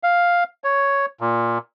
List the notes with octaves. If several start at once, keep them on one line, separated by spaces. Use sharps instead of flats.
F5
C#5
A#2